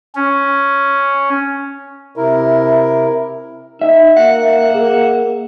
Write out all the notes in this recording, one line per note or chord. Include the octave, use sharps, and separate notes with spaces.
C#4
C3 E4 A#4
D#4 E5
A#3 F#5
G#4 A#4